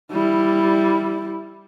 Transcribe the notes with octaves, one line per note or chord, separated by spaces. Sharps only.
G3 E4